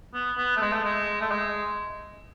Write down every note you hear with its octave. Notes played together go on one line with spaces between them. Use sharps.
B3
B3
A3
G#3
A3
G#3
A3
G#3